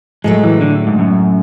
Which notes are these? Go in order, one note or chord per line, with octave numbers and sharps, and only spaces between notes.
A2 F#3 G#3 A3
E3
D3
G#2
F#2